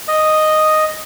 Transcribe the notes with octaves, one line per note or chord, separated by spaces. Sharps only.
D#5